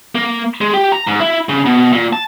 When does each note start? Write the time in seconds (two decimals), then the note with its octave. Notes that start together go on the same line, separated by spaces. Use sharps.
0.15 A#3
0.61 G#3
0.73 G4
0.92 A#5
1.07 G#2
1.20 E4
1.49 C#3
1.65 B2
1.93 A#2
2.13 A5